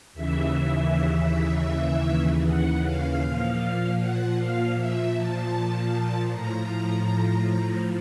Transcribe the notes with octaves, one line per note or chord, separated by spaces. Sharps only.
D#2 C#3 E3 E5
F#5
F5
A#2 F3
F#5
F5
E5
A5
A2 F3 A#5